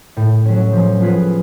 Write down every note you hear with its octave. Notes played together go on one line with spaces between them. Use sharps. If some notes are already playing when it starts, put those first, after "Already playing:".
A2
F#3 C#4
F3
B3 F4 G#4 B4